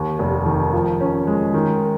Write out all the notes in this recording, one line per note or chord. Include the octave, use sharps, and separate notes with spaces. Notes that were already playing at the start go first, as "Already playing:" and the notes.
Already playing: D#2
F1
D#3
F3
C#4
G#3
D#3